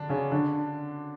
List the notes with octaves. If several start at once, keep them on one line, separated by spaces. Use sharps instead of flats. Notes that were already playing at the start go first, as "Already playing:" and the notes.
Already playing: D3 D4
C#3 C#4
D3 D4